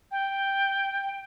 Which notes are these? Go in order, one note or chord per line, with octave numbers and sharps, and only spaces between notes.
G5